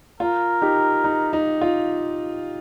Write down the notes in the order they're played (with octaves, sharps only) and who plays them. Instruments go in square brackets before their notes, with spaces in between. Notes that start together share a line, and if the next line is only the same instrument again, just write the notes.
[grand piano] F4 [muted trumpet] A#4
[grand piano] D#4 G4
D#4
D#4
F4